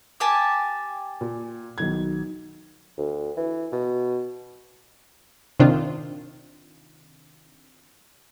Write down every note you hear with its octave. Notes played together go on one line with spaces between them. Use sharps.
G4 G#5 A5
A#2
B1 D#3 G#6
D2
E3
B2
C3 D#3 C4 D4 F4